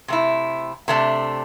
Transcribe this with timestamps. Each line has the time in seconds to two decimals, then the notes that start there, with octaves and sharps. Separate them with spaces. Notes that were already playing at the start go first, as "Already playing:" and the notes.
0.08 C3 A3 E4
0.88 C3 A3 D4